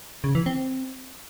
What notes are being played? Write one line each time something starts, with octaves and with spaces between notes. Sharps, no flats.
C#3
E3
C4